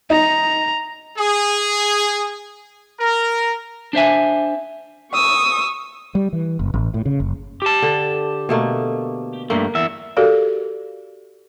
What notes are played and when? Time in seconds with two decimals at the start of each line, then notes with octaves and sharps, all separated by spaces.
0.10 D#4 A#5
1.18 G#4
3.00 A#4
3.93 D4 C5 E5 G#5
5.12 C#6 D#6 E6
6.15 G3
6.33 E3
6.59 F#1
6.74 A1
6.94 A2
7.06 C#3
7.20 F#1
7.62 G4 A5
7.82 D3
8.49 B2 A3 A#3
9.50 G2 A3 A#3
9.75 E2 E5
10.17 F#4 G4 A4 A#4 D5 F5